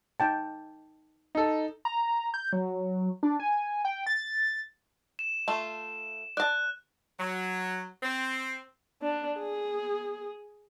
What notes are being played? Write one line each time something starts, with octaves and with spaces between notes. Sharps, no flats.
D#4 G5 A5
D#4 A4
A#5
G6
F#3
D4
G#5
G5
A6
E7
A3 F4
D5 A5 F#6
F#3
C4
D4
G#4